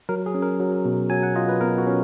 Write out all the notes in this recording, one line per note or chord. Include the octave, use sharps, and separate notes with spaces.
F#3 A#4
G#4
C#4
A#4
F#3
B2
F#3 G#5
F#5
F4 D#5
B4
B2 A#4
F#4
C#4